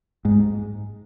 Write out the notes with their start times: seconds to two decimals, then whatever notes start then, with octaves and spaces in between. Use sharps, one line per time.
0.25 G#2